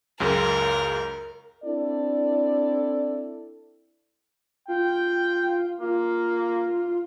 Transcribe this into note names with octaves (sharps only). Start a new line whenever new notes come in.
C#2 F#2 C#3 A#4
C4 D4 E4 A4 D5
F4 G5
A#3 F4